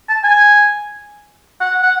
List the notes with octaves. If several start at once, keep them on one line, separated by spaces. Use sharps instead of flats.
A5
G#5
F#5
F#5